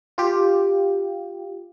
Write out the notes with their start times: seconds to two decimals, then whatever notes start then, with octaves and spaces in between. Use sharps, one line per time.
0.18 F4 G4